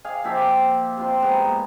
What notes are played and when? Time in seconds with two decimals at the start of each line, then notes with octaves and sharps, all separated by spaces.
0.04 G#4 F5 G#5
0.24 A#2 F3 G4 E5
0.97 C3 F4 C6
1.22 G#2 B3 G#4 A#5
1.45 A#2